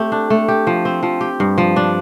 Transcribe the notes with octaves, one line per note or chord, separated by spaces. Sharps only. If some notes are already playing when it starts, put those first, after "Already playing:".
Already playing: A3 C4 G4
D4
A3
G4
F3
C4
F3
G4
G2
F3
D4